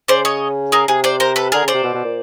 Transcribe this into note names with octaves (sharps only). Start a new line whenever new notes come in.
C#3 C5 D5
C#5 D#5
G#4 A#4
C3 G#4
C5 D5
A#4 C5
A4 B4
D3 G#4 A#4
C#3 C5 D5
C3
B2
B2
A#2